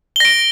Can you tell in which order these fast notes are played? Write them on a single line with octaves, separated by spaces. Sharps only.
G7 A#6 D7